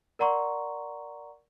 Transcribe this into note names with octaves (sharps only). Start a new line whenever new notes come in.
A#4 D5 F#5 A#5 C6 C#6